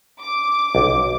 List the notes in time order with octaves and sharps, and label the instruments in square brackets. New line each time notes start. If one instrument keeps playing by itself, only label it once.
[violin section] D6
[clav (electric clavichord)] B1